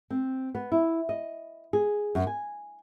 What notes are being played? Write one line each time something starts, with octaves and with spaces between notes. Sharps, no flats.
C4
B3
E4
D#5
G#4
F#2
G#5